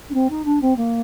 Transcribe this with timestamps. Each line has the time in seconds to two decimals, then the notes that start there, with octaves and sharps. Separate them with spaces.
0.10 D4
0.14 C4
0.30 D#4
0.45 D4
0.61 C4
0.77 A#3